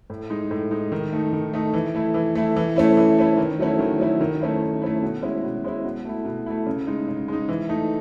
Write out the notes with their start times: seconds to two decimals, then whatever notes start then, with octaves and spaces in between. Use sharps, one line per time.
0.10 A2
0.30 G#3 D#4
0.51 A2
0.71 G#3 D#4
0.92 D#3
1.12 A3 D#4
1.33 D#3
1.53 A3 D#4
1.74 E3
1.95 A3 E4
2.14 E3
2.35 A3 E4
2.56 E3
2.76 A3 C#4 E4
2.97 E3
3.18 A3 C#4 E4
3.37 D#3
3.59 F#3 A3 C#4 E4
3.79 D#3
3.99 F#3 A3 C#4 E4
4.21 D#3
4.41 A3 C#4 E4
4.62 D#3
4.82 A3 C#4 E4
5.02 B2
5.23 G#3 C#4 E4
5.43 B2
5.64 G#3 C#4 E4
5.85 B2
6.05 A3 E4
6.25 B2
6.46 A3 E4
6.66 C#3
6.87 G#3 D#4
7.08 C#3
7.28 G#3 D#4
7.49 E3
7.69 A3 D#4